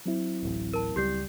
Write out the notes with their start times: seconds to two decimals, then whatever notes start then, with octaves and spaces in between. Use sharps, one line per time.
0.06 F#3 C4 E4
0.43 D1 A1
0.74 A#4 A5
0.96 C#2 G3 G4 G6 C7